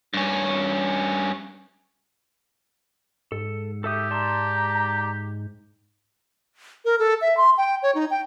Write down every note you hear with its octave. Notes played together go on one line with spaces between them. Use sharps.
G2 C#4
G#2 A4
G4 A4 E5 D#6
D5 A5 A#5 C6
A#4
A4
E5
C6
G5
C#5
D#4
G5